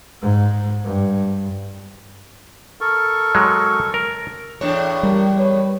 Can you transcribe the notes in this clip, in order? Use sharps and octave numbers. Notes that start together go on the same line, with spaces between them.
G#2
G2
A4 A#4 C#6
F#3 G#3
A#4
E2 A2 D4 C#5
G3 A#4
B4 C#5